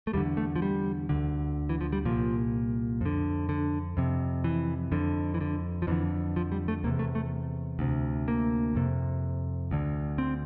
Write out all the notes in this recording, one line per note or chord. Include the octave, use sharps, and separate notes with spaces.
A3
E2 D3 G3
A3
F3
G3
D2 D3
E3
F3
G3
C2 A#2 F3
F2 D3
D3
F2 C3
E3
F2 D3
E3
D3
F3
F2 D3 E3
F3
G3
A3
E2 C3 A#3
A3
A3
D2 C3
A#3
F2 C3
D2 D3
C4